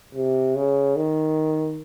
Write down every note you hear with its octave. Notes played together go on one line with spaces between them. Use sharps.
C3
C#3
D#3